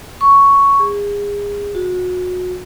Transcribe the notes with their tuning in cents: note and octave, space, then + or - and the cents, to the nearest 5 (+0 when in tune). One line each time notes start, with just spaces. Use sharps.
C#6 +5
G#4 -30
F#4 -30